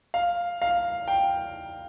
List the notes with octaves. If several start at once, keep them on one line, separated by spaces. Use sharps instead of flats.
F5
F5
G5